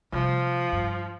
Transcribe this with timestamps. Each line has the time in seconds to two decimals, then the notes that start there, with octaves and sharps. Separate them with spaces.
0.13 C3 F3 G3
0.73 G2